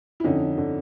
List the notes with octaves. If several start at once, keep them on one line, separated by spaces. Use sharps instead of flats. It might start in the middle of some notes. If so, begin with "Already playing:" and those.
E4
F2 D3 C#4 D#4
D3